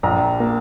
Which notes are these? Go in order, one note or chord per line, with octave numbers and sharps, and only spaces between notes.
A#1 A#5
A#3